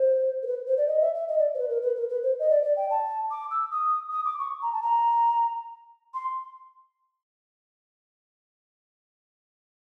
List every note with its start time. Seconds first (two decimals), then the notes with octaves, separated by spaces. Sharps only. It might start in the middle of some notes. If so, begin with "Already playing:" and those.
Already playing: C5
0.43 A#4
0.47 B4
0.67 C5
0.77 D5
0.88 D#5
1.01 E5
1.15 E5
1.28 D#5
1.39 D5
1.54 C5
1.59 B4
1.69 A#4
1.82 B4
1.96 A#4
2.09 B4
2.23 C5
2.39 D#5
2.50 D5
2.63 D5
2.76 G5
2.90 A5
3.31 D6
3.51 E6
3.71 D#6
4.12 D#6
4.25 D6
4.39 C#6
4.62 A#5
4.73 A5
4.83 A#5
6.14 C6